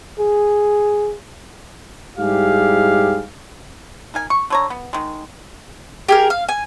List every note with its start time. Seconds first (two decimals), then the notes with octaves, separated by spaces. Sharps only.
0.19 G#4
2.18 G#2 G3 E4 G4 G#4 F5
4.14 D#4 A#4 G#5
4.30 C#6
4.50 D3 C#5 A#5
4.70 B3
4.93 D#3 G#3
6.09 G4 G#4 A#4
6.30 F5
6.49 G#5